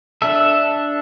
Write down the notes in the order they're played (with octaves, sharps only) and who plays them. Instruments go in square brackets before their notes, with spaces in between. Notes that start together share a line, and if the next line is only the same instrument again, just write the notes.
[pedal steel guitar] D4 A4 E5